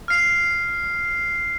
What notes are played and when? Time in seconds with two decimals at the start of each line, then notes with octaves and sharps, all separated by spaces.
0.08 F6 C7